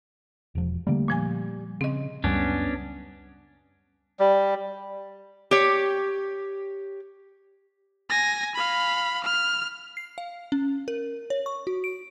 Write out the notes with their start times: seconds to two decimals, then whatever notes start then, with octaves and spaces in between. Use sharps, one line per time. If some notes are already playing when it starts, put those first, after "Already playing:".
0.55 E1 F3
0.87 D3 G3 A3 A#3
1.08 A#2 F3 G#5
1.81 C#3 C4 D#5
2.24 C#2 F#2 G3 B3 C#4 D4
4.20 G3
5.51 G4 C#5
8.10 G#5 A#6
8.55 F5 B5
9.24 F6
9.97 C7
10.18 F5
10.52 C#4
10.88 A#4
11.30 C#5
11.46 C#6
11.67 F#4
11.84 D7